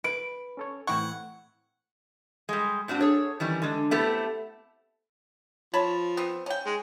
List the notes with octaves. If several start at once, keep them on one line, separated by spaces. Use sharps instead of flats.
B4 D7
C#4 A4 C#5
A2 E3 C4 E4 F#5 C#6 G#6
G3 G#3
A2 C4 D4 F#4
G#4 A4 C#5
D#3 E3 G3 C#4
D3 G#3
A3 B3 C4 E4 G4 A4
F3 C#5 A5 B5
B3 C4
C#4 G5
G#3